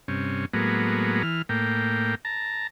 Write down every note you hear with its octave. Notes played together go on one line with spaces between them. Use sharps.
G2 C3 C#4
A2 F#3 G#3 A#3 B3
E3 F6
A2 A#3 G5
A5 A#5